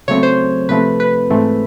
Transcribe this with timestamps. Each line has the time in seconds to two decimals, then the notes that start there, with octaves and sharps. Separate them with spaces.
0.08 C#3 F#3 A3 C4 C#5
0.23 C5
0.69 C3 F3 A3 C4 B4
1.00 B4
1.30 G#2 E3 A3 C4